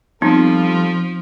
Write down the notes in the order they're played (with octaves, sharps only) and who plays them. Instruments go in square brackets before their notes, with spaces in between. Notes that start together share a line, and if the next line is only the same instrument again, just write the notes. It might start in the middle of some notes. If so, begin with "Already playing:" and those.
[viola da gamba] F3 [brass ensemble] G3 F4 A4 [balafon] B3 C4 D#4